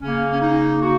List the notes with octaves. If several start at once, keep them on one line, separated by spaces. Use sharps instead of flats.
C#3 A#3 C#4
C#4
D#4
C#3 F#4